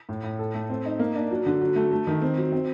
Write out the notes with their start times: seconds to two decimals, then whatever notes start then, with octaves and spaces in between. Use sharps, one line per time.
0.09 A2
0.23 A2
0.39 A4
0.54 A3
0.69 C4
0.85 D#4
0.99 A#3
1.15 D4
1.31 F#3
1.46 D3
1.61 F#3
1.76 A3
1.91 A3
2.07 D#3
2.22 C4
2.37 F#3
2.52 C4